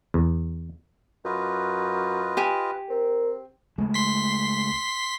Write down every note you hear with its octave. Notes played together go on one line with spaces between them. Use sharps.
E2
F#2 F4 B4 D#5
G4 G#5
C4 A#4
C#2 G#3 A3
C6 B6